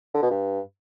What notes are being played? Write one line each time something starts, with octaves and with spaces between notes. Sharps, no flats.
D3
B2
G2